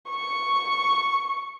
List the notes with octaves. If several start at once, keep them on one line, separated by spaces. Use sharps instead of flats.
C#6